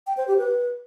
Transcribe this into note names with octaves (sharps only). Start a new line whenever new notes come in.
G5
C5
G4
B4